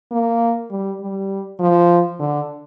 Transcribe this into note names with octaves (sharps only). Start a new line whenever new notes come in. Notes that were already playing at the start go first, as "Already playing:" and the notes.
A#3
G3
G3
F3
D3